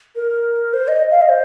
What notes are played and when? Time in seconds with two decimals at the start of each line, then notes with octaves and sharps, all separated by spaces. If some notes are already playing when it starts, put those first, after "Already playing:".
0.16 A#4
0.74 C5
0.88 D#5
1.11 F5
1.21 D#5
1.30 C5